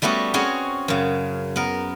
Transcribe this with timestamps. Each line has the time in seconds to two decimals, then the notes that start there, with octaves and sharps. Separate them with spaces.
0.02 G3 A3 B3 C#4 F#4
0.34 C4 C#4 F#4 G#4 C#5
0.88 F#2 C#3
1.56 B3 A#4